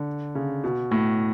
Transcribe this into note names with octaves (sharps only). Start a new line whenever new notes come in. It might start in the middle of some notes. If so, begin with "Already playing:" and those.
Already playing: D3
C#3
B2
A2